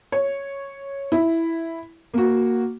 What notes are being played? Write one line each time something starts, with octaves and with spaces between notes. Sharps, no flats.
C#5
E4
A#3 F#4